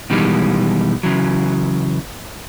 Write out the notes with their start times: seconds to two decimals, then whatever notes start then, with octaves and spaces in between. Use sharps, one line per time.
0.10 B2 D#3 E3 G3 G#3
1.03 C#3 E3 F#3